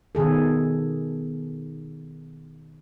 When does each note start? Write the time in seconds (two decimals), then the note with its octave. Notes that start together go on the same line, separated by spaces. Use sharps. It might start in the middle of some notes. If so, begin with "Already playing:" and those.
0.15 B2 D#3 G#4 A4